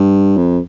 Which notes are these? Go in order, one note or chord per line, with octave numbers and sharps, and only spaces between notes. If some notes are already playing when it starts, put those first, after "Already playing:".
Already playing: G2
F2